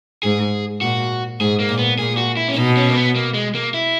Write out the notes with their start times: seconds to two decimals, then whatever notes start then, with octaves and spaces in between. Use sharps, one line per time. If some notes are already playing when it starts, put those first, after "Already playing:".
0.23 G#2 G#4
0.81 A#2 F#4
1.40 G#2 G#4
1.60 A#3
1.69 A#2
1.79 B3
1.99 A#2 G#4
2.17 F#4
2.37 E4
2.48 C#4
2.56 B2 D#4
2.77 C#4
2.89 A#3
2.95 B3
3.15 A#3
3.34 G#3
3.55 A#3
3.74 E4